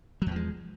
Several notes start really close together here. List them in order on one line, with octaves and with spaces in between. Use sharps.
F#3 E2 F3 G#3